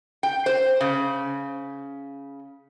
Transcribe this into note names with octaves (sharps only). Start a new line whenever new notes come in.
G5
C5
C#3